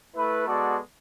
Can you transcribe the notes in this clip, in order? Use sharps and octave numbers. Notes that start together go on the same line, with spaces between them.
A3 E4 B4
G#3 B3 F#4 A4 D5